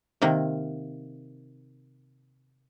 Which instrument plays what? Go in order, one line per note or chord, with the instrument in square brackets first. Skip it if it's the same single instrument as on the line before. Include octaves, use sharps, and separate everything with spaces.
[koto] C3 D#3 A#3